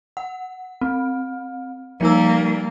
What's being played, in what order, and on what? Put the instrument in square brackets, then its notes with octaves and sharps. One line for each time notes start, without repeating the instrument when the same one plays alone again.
[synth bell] F#5
C4
[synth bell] F3 D#4 E6 [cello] G3 A#3